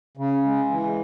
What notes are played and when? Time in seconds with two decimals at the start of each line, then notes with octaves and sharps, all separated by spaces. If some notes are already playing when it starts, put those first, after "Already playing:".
0.17 C#3
0.44 G#3
0.71 E3